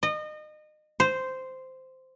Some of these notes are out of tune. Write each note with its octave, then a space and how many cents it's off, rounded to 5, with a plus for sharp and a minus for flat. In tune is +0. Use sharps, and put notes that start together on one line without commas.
D#5 -30
C5 -10